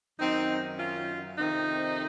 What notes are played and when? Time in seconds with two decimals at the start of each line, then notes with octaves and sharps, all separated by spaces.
0.19 F#2 D#3 C4 D#4
0.78 C#4 F4
1.38 F2 C3 D#3 C4 D#4